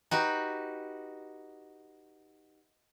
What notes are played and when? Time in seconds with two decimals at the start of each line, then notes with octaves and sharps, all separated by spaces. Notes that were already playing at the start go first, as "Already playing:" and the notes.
0.11 D#4 F#4 G4 B4